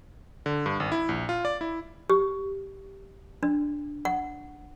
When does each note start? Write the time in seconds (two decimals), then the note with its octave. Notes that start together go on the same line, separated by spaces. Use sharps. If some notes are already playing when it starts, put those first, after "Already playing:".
0.46 D3
0.66 G2
0.80 G#1
0.92 E4
1.09 A#1
1.29 F4
1.45 D5
1.61 E4
2.10 G4
3.43 D4
4.05 F#5